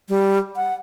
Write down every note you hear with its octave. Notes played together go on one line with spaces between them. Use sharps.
G3
F#5